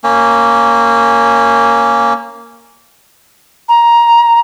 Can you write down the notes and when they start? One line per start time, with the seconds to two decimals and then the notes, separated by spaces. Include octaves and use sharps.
0.04 A#3 C#4
3.69 A#5